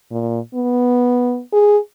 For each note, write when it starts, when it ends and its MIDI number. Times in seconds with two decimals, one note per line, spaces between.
0.11 0.40 46
0.55 1.41 59
1.53 1.78 68